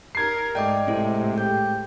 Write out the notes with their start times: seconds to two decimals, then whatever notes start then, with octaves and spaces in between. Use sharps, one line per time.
0.15 D#4 A#4 G#6 C7
0.55 G#2 A3 D5 D#5 G5 D6
0.87 A2 C3 G#3 C4 E4 A4
1.38 G4 G6